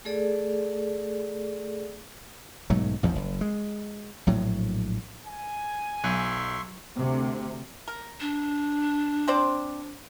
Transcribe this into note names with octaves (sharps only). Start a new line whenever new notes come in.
A3 G#4 A4 D5
B1 G#2 F#3 A3
A1 E2 G2 F3
F#1
G#3
A#1 A2 F#3
G#5
B1 F#3 E5 C6 C#6
D2 C3
A#4
D4
C4 C5 D5